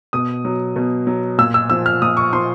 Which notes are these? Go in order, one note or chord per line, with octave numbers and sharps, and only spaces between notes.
B2 D#6
F#3
B2
F#3
A#2 E6
E6
F3 E6
F6
A#2 D#6
C#6
F3 C6